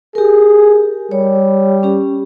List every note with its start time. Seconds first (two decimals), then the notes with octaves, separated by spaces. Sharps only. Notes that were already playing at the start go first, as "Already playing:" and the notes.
0.15 G4 G#4 A#4
1.12 G3 C#5
1.83 C#4 G4